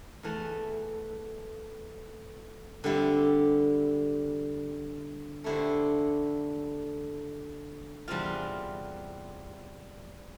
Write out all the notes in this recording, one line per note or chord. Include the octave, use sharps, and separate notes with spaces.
E2 E3 A3
D3 G3 C4 E4 G4
D3 A3 E4 G4 C5
E2 C3 G3 C4 F4